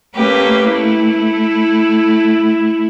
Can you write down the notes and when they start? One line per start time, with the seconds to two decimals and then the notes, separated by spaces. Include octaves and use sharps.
0.15 A3 A#3 C#4 G4 B4
0.63 A3 E4